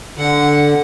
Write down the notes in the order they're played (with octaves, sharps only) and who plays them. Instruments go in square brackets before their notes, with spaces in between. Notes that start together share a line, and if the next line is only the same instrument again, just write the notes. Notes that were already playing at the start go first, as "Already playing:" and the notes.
[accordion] D3 [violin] F#5